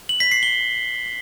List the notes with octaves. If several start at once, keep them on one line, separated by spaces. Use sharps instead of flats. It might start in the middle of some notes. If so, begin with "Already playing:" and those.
F#7
B6
C7
G7